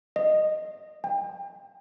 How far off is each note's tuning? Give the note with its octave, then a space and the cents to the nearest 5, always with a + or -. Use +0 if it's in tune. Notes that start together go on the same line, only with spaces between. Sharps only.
D#5 -10
G5 +30